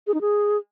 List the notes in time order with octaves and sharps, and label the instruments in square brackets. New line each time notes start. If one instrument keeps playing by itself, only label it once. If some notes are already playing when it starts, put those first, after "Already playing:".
[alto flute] G#4
D#4
G#4